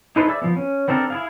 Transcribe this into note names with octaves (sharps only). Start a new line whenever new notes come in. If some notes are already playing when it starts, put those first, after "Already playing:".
D#4 E4 A4 B4 C5
G#4 D5 E5 E6
F3 B3
C#4
B3 C4 D4 A4 A#4
E4 G#4 F5